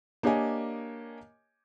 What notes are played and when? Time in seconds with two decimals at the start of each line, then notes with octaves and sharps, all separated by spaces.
0.23 A#3 D4 G4 C#5 D#5 G#5